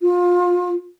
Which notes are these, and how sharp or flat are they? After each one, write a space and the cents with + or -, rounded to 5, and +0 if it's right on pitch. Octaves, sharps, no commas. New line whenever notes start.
F4 +25